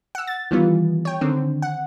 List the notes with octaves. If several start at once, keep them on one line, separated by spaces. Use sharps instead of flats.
F#5 E6
A6
D#3 E3 G3 B3 F4
C#5 G5
D3 D#3 C4
F#5